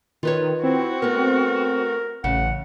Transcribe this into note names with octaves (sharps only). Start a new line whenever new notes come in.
D#3 F4 B4 C#5
C4 E4 F#4
A3 B3 A#4
A1 C#3 F#5